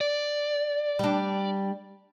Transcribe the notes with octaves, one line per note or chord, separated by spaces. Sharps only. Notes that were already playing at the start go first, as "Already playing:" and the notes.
D5
G3 D4